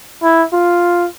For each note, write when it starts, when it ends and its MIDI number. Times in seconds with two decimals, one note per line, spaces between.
0.23 0.44 64
0.53 1.07 65